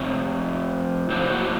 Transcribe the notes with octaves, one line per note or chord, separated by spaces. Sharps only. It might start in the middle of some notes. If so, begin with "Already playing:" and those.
Already playing: F2 C3 C#5
A2 F#3 A#3 D4 C5
F#4